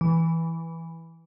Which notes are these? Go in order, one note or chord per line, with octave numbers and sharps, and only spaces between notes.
E3